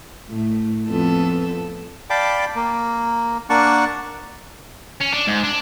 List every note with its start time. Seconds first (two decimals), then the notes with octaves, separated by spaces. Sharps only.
0.28 A2 A3
0.88 F2 B3 A4
2.10 D5 F5 G5 A5 B5 D6
2.56 A#3
3.50 A#3 D4 F#5 A5 C#6
5.00 C#4
5.13 D4
5.27 G#2
5.43 D4